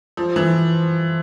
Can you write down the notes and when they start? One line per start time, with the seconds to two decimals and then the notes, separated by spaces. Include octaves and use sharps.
0.17 F3
0.36 E3